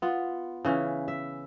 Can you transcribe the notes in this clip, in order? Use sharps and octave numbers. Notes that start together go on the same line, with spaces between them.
B3 F4
C#3 E3 C#4
E5